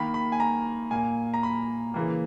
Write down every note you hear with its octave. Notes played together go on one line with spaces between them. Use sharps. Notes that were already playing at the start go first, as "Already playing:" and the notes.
Already playing: D#3 A#3 B5
B5
G#5
A#5
A#2 A#3 G#5
A#5
B5
C#3 E3 A#3